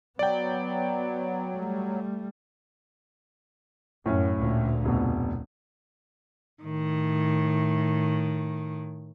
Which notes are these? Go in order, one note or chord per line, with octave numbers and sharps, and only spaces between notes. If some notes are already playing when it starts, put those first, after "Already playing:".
F#3 B3 D5 G5
G3 A3
F#2 A2 C#4
D2 A#2
F1 B2
A2 D#3